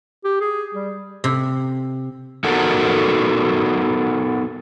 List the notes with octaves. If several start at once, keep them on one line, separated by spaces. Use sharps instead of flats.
G4
G#4
G3
C3
B3 D#4 F#4 A4 A#4